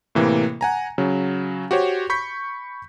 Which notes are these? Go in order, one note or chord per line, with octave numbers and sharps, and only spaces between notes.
A2 C3 E3 A#3
F#5 G#5 A#5
C#3 F#3
F#4 G4 C5 C#5
B5 C#6 G6 B6